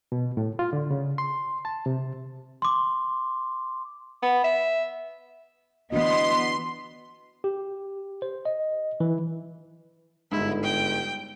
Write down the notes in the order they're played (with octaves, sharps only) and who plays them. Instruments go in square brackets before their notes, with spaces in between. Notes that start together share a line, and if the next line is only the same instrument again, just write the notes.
[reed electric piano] B2
A2
F4
D3
C#3
C6
A5
C3
[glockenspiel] C6 D6
[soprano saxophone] B3
E5
[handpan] E3 D4 F#4 [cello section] B3 [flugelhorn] D#5 [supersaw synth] C6
[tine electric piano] G4
C5
D#5
E3
[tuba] G1 [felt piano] G#2 G#3 [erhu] E4
[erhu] G5